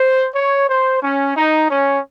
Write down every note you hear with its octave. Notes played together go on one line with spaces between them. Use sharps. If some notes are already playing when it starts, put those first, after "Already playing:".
Already playing: C5
C#5
C5
C#4
D#4
C#4